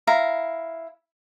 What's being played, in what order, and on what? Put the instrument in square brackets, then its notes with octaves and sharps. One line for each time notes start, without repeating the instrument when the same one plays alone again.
[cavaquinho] E4 F5 A#5